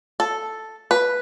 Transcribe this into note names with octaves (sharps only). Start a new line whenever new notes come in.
A4
B4